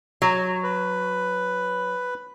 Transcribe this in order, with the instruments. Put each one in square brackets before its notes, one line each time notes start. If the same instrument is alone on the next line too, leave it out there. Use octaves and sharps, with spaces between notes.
[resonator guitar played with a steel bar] F#3
[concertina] B4